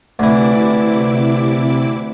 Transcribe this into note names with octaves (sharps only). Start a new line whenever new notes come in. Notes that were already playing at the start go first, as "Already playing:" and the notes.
D2 C3 E3 E4 D6